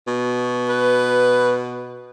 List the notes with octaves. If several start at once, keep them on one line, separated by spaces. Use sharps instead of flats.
B2
B4